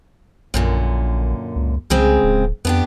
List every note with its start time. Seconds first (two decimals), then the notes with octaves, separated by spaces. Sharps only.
0.54 A#1 F#2 A#2 D3
1.56 C#2
1.90 C2 C#3 G#3 C4
2.23 D1
2.65 F2 B3 D4 G4